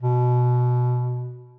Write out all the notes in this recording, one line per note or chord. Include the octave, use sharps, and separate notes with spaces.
B2